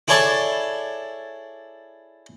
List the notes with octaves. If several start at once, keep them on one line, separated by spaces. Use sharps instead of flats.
E4 G#4 A4 C#5 D5 A5